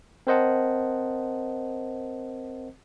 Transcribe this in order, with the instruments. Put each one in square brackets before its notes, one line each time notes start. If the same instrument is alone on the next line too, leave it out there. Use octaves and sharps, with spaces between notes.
[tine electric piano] C4 A#4 C5 D#5 F#5 A5